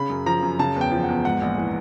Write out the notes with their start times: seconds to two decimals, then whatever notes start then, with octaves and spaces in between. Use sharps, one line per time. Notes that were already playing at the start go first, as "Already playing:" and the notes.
Already playing: C#3 B5
0.10 F#2
0.26 F3 A#5
0.43 F#2
0.59 C#3 A5
0.76 E2 G5
0.92 F3
1.03 F#5
1.09 E2
1.25 G#2 F#5
1.42 A#1
1.58 E3